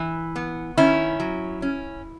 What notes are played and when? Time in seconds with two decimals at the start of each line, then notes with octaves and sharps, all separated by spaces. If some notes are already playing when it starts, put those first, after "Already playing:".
Already playing: E3
0.36 B3
0.77 D#3 C#4 E4
1.20 F#3
1.62 C#4